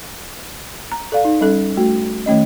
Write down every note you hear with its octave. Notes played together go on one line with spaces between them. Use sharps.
A#5
A4 D5 F5
D#4
G3 C#4 A4
A3 F#4
D#3 A3 C#4 D#5